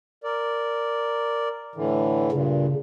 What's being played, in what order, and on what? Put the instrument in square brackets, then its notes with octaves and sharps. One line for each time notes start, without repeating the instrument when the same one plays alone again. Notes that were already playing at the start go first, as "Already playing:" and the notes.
[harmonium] A#4 D5
A2 D3 E3
[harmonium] G2 A#2 [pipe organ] C#3